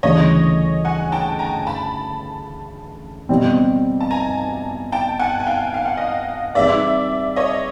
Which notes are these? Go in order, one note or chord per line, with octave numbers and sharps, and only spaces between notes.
D2 C#3 E3 G3 C#5 D#5
F#5 G#5
G5 A5
G#5 A#5
A5 B5
B2 G3 C4
A5
G#5 A#5
G5 A5
F#5 G#5
G#5
F5 G5
F5
F#5
D#5 F5
G3 C4 D#4 G#4 B4 D5 E5
C#5 D#5